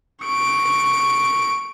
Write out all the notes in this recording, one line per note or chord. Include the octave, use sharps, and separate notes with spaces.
C#6 D7